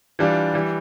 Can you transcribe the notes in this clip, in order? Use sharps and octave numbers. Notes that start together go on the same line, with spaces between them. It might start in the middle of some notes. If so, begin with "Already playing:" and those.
E3 G3 D4 F4
E3 G3